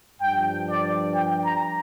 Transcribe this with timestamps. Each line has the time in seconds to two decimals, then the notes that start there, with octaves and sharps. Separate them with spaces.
0.21 G2 F3 D4 G5
0.68 D5
1.13 G5
1.44 A#5